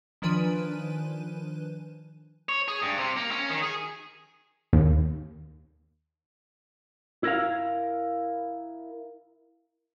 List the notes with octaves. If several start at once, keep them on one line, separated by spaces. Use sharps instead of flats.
D#3 F3 D4 B4 G#5 D#7
C#5
G#4
G2
C3
A#3
C#4
D#3
G#4
D#2
E4 A#4 F5